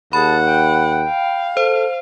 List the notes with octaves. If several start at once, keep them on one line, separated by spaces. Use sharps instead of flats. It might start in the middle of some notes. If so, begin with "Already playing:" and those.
D#2 G#4 F#5 A5 B5
G5
F5
A4 C5